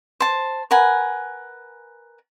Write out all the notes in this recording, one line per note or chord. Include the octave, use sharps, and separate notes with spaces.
C5 A5
A#4 B4 F#5 G#5